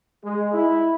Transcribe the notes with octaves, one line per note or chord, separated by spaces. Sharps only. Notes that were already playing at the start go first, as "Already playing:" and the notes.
G#3
E4